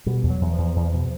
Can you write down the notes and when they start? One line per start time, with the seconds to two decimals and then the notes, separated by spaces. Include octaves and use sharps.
0.06 B2 G3
0.23 E2
0.30 F#3
0.41 E2
0.53 E2 F3
0.76 E2
0.94 B2